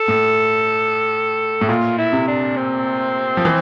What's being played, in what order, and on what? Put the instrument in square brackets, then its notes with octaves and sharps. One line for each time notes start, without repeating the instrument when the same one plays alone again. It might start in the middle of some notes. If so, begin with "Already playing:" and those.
Already playing: [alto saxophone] A4
[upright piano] A2
A2
[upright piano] A#2 [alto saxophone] F4
[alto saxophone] E4
[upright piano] C3
[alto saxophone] D4
C4
[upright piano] F3
E3